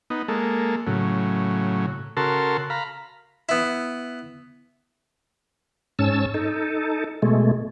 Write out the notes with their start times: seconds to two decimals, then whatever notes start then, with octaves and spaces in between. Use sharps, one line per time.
0.10 B3 D#4
0.28 G#3 A#3 A4
0.87 A2 C#3 F#3
2.17 C#3 F#4 A4 A#4 A5 C6
2.70 F5 A#5 B5
3.49 B3 E4
5.99 G#2 C#4 A5 E6
6.34 D#4 A4
7.22 B2 G#3 A3